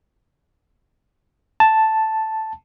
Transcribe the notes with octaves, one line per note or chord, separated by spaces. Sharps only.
A5